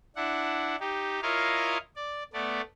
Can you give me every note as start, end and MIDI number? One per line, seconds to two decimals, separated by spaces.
0.16 0.76 62
0.16 0.76 64
0.16 0.76 78
0.80 1.20 63
0.80 1.20 67
1.22 1.78 64
1.22 1.78 65
1.22 1.78 70
1.22 1.78 73
1.22 1.78 75
1.22 1.78 77
1.96 2.23 74
2.33 2.61 57
2.33 2.61 59
2.33 2.61 74